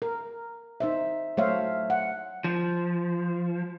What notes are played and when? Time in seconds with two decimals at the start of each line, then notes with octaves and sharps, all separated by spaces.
0.02 A#4
0.80 D#4 C5 E5
1.37 F#3 A3 C5 C#5 E5 F5
1.90 F#5
2.44 F3